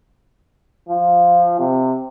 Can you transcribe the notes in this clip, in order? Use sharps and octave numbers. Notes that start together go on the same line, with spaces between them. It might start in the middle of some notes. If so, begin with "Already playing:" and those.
F3
C3